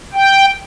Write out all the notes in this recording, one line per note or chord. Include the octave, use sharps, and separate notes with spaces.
G5